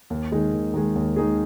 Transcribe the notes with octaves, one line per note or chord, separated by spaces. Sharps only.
D#2
D#3 G#3 D#4 G#4
D#2
D#3 G#3 D#4 G#4
D#2
D#3 G#3 D#4 G#4